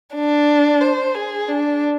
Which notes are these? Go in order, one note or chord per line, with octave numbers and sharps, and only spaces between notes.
D4
C5
G#4
D4